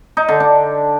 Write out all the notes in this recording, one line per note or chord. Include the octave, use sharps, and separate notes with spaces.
D#4
D3
D4